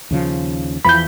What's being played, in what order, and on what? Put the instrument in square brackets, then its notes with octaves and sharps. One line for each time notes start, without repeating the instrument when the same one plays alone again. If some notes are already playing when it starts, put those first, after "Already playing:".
[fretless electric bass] D#2 C#3 F3
[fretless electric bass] E2 E3 F3 [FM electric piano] B5 G6